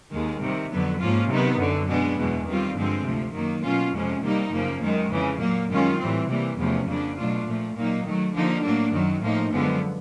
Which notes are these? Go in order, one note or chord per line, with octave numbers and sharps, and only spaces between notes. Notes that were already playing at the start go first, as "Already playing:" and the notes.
D#2 D#3 G#3
C3 D#3 G3
F2 D3 F#3 B3
G#2 F3 A#3 C#4 F4
C3 D#3 F#3 B3 D#4
F#2 D3 F#3
B2 G#3 B3 D4
E2 B2 G#3
D#3 G3 C4 F4
G2 D3 F3 G#3 C4
D2 C3 F3
F#2 D#3 F#3 A#3
B2 F#3 A#3 C#4 F4
F2 C3 F3 G#3 C#4
C3 D#3 G3 A#3 D#4
F#2 C#3 F3 A#3
F#2 D#3 G#3
F2 C#3 E3
A#2 F#3 A#3
F#2 D#3 G#3 C#4 F4
A2 E3 G3 C4
C3 E3 G3 A#3
E2 C3 F3 A3 C#4
F2 C#3 F#3 A#3 D4
B2 F#3 A3 D4 F4
A#2 F3 A3
A#2 F#3 A#3 D#4
D#3 F#3 A3
D3 F3 A#3 D#4
A2 F#3 A#3 D4
F#2 D#3 F#3
A2 F3 A#3 D#4
F#2 D3 F3 G#3 B3